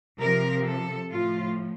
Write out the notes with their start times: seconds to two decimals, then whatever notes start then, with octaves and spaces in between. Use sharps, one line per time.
0.20 C3 F3 A#4
0.66 A4
1.12 A2 F3 F4